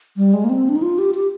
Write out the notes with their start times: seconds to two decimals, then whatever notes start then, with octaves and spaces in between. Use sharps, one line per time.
0.17 G3
0.34 G#3
0.44 A#3
0.50 C4
0.69 D4
0.76 D#4
0.82 F4
0.99 G4
1.14 G4